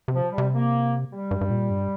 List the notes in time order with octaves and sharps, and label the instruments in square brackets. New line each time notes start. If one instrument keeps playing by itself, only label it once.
[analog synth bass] C3
[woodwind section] F3
G3
[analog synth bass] C3
[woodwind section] A#3
G3
[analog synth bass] G2
G2
A#2
G2